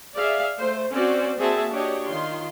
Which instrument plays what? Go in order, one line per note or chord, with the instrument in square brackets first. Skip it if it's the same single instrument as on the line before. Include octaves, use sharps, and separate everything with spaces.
[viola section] G#4 D5 E5 F5
A3 C5
C4 C#4 F#4 C5 D5
A#3 C4 F#4 G#4 E5 A5
D4 F#4 G4 C#5 D#5
D#3 F4 C6